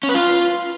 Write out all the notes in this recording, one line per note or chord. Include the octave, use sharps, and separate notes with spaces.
C#4
B4
F4